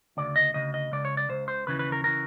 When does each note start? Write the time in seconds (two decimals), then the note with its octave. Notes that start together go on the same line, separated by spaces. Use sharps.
0.17 D2 C#3 D5
0.36 D#5
0.54 D2 C#3 D#5
0.74 D#5
0.92 C#2 C#3 D5
1.05 C#5
1.17 D5
1.29 C#2 C#3 C5
1.48 C5
1.67 D#2 C#3 E3 B4
1.79 B4
1.92 A#4
2.04 C#3 E3 A#4